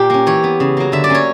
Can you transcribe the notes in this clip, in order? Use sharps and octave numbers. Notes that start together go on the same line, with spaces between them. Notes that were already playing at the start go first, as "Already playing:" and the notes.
Already playing: A#2 G4
A#3 C#4
E3 C#5
B3
C#3
F#3 A#3
D3 E5
D5
A#3 C#4 C#5